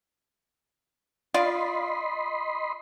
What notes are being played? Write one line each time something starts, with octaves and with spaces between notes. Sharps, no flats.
F4 D5 D#5 F5 B5 C6